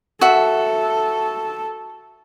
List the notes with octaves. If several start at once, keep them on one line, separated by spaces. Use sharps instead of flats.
F#4 A4 E5